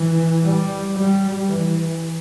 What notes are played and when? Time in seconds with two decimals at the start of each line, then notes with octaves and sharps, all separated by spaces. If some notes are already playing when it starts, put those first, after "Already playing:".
Already playing: E3
0.42 G3
0.95 G3
1.48 E3